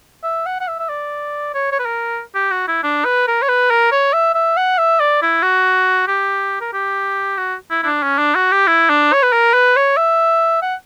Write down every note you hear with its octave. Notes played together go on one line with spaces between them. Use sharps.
E5
F#5
F#5
E5
E5
D5
C#5
C#5
B4
A#4
G4
F#4
E4
D4
B4
A#4
C#5
B4
A#4
C#5
E5
E5
F#5
E5
D5
E4
F#4
G4
A#4
G4
F#4
E4
E4
D4
C#4
D4
F#4
G4
E4
D4
C#5
B4
A#4
B4
C#5
E5
F#5